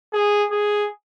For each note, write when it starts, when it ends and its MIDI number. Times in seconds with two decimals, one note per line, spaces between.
0.14 0.46 68
0.51 0.88 68